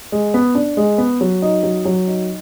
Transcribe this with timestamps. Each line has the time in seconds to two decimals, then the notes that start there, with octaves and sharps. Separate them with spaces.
0.12 G#3
0.34 B3
0.55 D4
0.77 G#3
0.98 B3
1.21 F#3
1.42 D#4
1.63 F#3
1.85 F#3
2.07 D#4